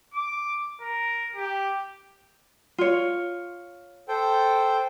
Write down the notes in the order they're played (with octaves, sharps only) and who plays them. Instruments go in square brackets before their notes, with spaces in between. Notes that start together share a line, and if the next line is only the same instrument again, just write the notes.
[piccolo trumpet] D6
A#4
G4
[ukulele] F4 C#5
[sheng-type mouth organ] A4 C5 G5